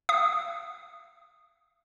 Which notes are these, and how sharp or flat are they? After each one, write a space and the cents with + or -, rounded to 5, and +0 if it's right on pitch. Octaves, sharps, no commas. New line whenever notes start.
F5 -40 D#6 -5